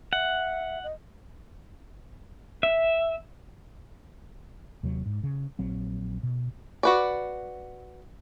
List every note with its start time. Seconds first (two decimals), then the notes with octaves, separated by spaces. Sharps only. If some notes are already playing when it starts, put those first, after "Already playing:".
0.13 E5 F#5
0.84 D#5
2.63 E5
4.83 D#2 C3 F#3
5.06 G#2
5.23 C#3
5.59 A#1 F#3 C4
6.23 B2
6.83 F#4 B4 D5